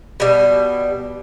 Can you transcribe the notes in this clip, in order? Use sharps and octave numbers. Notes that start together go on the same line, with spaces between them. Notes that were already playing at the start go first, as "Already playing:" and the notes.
B2 G3